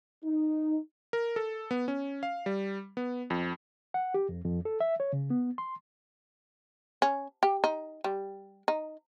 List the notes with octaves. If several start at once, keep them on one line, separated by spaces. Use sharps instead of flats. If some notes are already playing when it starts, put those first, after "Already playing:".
D#4
A#4
A4
B3
C#4
F5
G3
B3
F2
F#5
G4
F2
F2
A4
E5
C#5
C#3
B3
C6
C#4
G4
D#4
G3
D#4